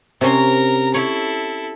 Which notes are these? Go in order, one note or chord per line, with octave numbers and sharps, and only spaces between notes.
C3 C#4 A#4 A#5 C6
E4 A4 C#5